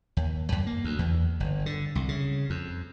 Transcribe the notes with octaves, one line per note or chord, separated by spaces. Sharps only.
D#2
F#2
A#3
D2
E2
G1
D3
C2
C#3
F2